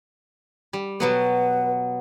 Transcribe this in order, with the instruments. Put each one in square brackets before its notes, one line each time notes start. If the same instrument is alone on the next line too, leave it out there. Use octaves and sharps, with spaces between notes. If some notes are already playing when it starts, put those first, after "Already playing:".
[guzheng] G3
[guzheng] B2 F#3 B3 [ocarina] B4